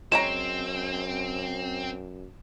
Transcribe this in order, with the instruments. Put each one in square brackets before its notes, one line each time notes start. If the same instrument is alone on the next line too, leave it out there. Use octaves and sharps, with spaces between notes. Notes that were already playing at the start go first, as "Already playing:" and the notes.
[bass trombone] F#2 [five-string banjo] G#3 C#5 A#5 [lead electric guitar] C4 [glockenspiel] E7